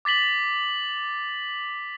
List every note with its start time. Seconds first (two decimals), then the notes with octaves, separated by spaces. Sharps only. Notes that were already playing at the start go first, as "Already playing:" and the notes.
0.05 D6 A6 B6 F#7 G7